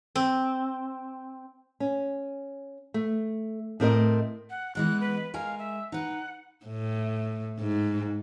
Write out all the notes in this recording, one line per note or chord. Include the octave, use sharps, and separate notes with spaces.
C4
C#4
A3
A2 C4 A#4 D#5
F#5
E3 G#3 B3 F#6
B4
G#3 A#4 F5 G#5
E5
D#4 B4 F#5
A2
G#2